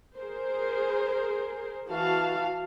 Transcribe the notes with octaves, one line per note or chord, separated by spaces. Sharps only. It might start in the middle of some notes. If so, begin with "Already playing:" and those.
G#4 A#4 C5
E3 F#4 F5 A5